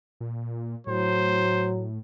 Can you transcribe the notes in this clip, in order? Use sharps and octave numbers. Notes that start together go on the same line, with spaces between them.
A#2
A2 F#3 C5